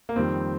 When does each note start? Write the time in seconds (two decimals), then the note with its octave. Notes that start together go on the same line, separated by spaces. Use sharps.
0.09 A#3
0.16 F2 D#3 G3 C4